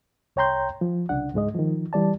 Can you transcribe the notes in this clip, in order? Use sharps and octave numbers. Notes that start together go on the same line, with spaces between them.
C2 C#5 G5 A#5 C6 G6
F3
C2 C#3 D4 F#5
C#2 G#2 G#3 D#5
D#3 F3
E3 G3 D5 A5